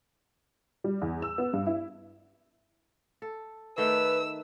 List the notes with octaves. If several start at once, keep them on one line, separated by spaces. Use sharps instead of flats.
G3
E2
E6
B3
G2
E4
A4
D#3 A3 B4 G5 E6